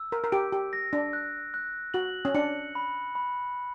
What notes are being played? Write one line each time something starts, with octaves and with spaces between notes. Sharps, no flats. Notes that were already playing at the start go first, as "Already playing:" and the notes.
Already playing: E6
A#4
A#4
G4 D7
G4
A#6
D4
F#6
F#6
F#4 F#7
C#4
D4 C#7
B5
B5